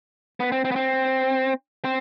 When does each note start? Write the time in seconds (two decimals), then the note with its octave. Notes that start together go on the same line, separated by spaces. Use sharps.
0.40 B3
0.52 C4
0.65 C4
0.71 B3
0.76 C4
1.84 C4